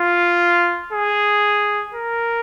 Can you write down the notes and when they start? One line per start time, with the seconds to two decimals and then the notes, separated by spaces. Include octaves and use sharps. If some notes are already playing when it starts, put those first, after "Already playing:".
Already playing: F4
0.92 G#4
1.94 A#4